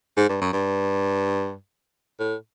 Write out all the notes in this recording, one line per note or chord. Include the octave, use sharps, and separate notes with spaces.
G#2
G2
F#2
G2
A2